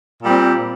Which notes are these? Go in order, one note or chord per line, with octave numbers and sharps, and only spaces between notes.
A#2 G3 C4